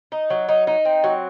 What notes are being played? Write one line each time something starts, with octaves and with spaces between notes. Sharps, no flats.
D#4
F#3
D#4
D#4
C4
F#3